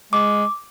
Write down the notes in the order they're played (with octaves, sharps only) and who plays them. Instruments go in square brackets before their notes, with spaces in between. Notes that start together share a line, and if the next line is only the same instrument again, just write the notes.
[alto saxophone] G#3 [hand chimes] D6